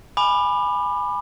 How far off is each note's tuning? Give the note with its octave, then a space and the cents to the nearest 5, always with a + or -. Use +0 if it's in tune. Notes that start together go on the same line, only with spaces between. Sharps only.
G#5 +0 B5 +0 D6 +30